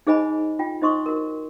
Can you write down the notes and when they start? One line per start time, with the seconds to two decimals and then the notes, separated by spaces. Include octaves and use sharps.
0.07 D#4 G#4 C5 D#5 G#5 B5
0.59 F4 G5
0.82 D#4 C5 D#5 C6 C#6 D#6
1.06 F#4 A#4